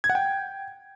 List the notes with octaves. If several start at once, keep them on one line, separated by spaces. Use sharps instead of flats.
G#6
F#5
G5